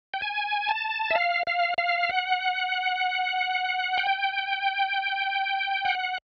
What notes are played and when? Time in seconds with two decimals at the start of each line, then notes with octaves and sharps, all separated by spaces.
0.14 G5
0.22 G#5
0.68 A5
1.11 E5
1.15 F5
1.47 F5
1.78 F5
2.09 F#5
3.97 G5
5.85 F#5